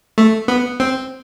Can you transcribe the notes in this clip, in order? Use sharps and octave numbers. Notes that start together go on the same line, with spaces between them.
A3
B3
C4